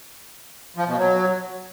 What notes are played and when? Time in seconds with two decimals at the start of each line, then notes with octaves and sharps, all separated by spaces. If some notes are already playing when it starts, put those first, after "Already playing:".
0.77 F3
0.87 B2
0.97 F#3